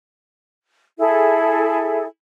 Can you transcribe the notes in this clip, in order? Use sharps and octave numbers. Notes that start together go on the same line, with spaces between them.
E4 G#4 A4